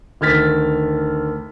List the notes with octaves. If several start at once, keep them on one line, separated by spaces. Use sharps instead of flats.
D2 D#3 F6 G#6 A6 B6